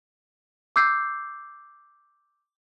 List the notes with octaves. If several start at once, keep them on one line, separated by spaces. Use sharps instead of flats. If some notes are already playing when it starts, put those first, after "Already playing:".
D6 E6 G6 C7